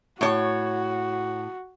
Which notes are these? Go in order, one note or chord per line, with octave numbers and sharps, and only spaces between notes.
A2 F#4 C#5